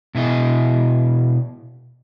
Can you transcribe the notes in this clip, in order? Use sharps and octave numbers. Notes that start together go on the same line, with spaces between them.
B2 E4 G#4 D#5